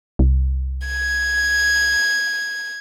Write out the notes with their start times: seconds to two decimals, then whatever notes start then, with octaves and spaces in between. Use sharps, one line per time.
0.19 C2
0.87 G#6